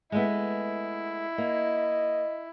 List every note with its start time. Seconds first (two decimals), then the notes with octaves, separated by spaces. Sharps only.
0.12 G#3 A3 B3 E4
1.38 A#3 D#5